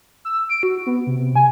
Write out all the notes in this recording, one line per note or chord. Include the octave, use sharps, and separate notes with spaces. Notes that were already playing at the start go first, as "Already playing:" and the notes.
E6
D7
F#4
B3
C3
G#5